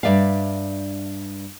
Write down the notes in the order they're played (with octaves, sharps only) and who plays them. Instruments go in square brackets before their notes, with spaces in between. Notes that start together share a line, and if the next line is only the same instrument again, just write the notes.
[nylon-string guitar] G2 F3 D5 E5 F5